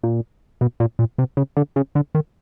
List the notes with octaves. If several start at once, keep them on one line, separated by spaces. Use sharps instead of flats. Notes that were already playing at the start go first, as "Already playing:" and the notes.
A#2
B2
A#2
A#2
C3
C#3
D3
C#3
D3
D#3